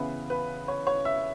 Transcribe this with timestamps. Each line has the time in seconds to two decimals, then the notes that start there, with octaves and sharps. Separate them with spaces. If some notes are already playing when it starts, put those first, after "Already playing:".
Already playing: C#3 E3 B3 E4 B4
0.30 B4
0.68 C#5
0.87 C#5
1.05 E5